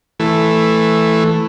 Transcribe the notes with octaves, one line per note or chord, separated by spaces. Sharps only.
E3 A3